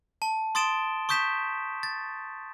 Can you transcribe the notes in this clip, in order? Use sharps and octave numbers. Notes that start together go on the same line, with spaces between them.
A5
C6 D#6 A6 D7 E7 G7
C#6 D#6 G6 B6 E7
A6